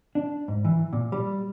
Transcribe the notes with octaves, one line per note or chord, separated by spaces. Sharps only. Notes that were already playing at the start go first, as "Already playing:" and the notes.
D4
G#2
E3
A#2
G3